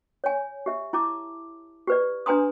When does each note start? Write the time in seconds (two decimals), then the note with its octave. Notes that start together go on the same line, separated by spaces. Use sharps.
0.24 C#5 G#5
0.66 G4 E5
0.93 E4 A5 D6
1.87 G4 B4 D5
2.26 D4 B4 G#5 A#5 C6 D#6